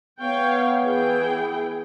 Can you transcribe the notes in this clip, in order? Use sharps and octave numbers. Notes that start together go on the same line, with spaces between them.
B3 C#5 F5 G5
E3 G#4 G5